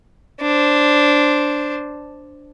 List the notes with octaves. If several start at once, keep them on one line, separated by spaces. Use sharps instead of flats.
D4 C5